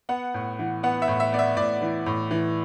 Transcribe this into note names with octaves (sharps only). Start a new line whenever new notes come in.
B3 F#5
A2
E3
B3 F#5
E5
A2
E5
B3 D5
E5
A2 D5
E3
A2
E3